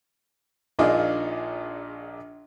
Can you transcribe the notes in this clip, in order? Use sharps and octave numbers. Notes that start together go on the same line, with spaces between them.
A#1 A#2 D4 D#4 F4 G#4